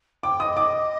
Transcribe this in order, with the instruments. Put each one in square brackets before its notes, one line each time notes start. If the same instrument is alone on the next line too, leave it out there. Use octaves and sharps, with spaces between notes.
[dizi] G5 [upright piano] D6
[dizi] D#5 [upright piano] D#6
[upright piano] D6